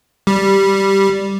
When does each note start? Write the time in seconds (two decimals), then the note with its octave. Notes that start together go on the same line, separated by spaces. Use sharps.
0.27 G3